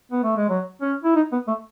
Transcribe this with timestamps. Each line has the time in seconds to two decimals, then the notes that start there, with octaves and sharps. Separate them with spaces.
0.12 B3
0.24 A3
0.37 G#3
0.49 F#3
0.82 C#4
1.04 E4
1.16 D#4
1.32 B3
1.47 A3